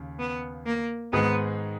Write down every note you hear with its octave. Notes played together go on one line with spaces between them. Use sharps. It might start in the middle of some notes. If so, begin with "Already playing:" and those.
Already playing: D#2 C#3
B3
A#3
G#2 D#3 G#3 B3 D#4 G#4